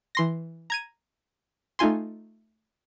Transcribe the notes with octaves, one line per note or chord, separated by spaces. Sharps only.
E3 C6 A#6
A#5 G#6 D#7
A3 D#4 F4 G#5 C6